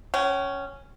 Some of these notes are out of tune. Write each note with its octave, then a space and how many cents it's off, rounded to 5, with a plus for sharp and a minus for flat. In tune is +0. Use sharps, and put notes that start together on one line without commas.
C#4 +0 G5 -45